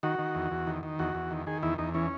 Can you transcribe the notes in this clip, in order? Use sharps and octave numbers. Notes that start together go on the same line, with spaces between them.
D#3 F#4
D#3
E2
E2
D#3
D#3
E2 F#4
E2
D#3
D#3 G#4
E2 E4
E2 D#4
E3 C#4